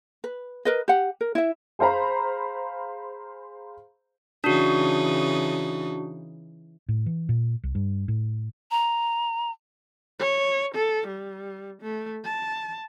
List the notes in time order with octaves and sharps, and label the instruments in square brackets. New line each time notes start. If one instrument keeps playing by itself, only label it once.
[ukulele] B4
A#4 B4 D#5
G4 F#5
A#4
E4 E5
[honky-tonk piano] G#4 C5 F5 A#5 B5
[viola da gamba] C#3 E3 D#4 [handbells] D4 F#4
[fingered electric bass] A2
E3
A#2
C2
G2
A2
[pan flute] A#5
[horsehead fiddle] C#5
A4
G3
A3
A5